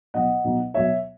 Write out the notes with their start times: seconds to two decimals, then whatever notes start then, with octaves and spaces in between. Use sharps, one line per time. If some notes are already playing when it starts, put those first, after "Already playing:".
0.14 B2 F#3 B3 D#4 D#5 F#5
0.44 B2 F#3 B3 D#4
0.74 B2 F#3 B3 D#4 C#5 E5